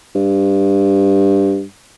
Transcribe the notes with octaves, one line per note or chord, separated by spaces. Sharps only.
G2